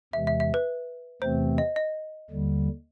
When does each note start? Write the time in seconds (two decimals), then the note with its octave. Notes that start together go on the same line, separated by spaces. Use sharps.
0.13 E2 C3 E3 G#3 E5
0.27 E5
0.40 E5
0.54 B4
1.22 E2 C3 E3 A3 C4 C5
1.58 D#5
1.76 D#5
2.30 D#2 D3 G3